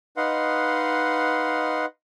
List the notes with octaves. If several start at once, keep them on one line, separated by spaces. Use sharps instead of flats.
D#4 B4 D#5 F5 F#5 C6